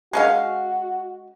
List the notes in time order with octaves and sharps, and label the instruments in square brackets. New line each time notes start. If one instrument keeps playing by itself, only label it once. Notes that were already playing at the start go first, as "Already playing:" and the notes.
[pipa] G#3 C#4 F5 [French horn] F#4